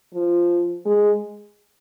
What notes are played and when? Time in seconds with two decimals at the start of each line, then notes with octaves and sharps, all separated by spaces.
0.14 F3
0.85 G#3